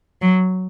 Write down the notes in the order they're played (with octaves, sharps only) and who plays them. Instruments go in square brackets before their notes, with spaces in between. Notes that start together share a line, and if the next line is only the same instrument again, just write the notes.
[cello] F#3